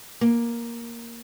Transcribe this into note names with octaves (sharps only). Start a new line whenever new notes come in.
A#3